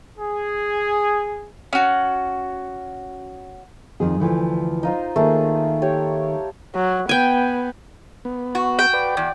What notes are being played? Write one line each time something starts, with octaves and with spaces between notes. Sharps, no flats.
G#4
C#4 F#4
F2 D#3 G#4
D2 E3 F3
D#4 F4 C5
D#3 A3 A#3 G#4
G4 C#5
F#3
B3 G5 G#5
B3
F#4
G5
B4 D5
E2 D5